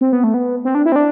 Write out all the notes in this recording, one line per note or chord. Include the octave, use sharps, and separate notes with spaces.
C4
B3
A3
B3
C4
D4
E4
C4
D4